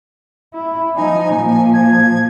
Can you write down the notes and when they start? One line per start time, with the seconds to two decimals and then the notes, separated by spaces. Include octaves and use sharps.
0.54 E4
0.96 F3 D#4 G#5
1.35 A#2 F3
1.74 G#6